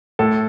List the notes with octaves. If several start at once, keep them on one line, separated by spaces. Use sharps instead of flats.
A2 A4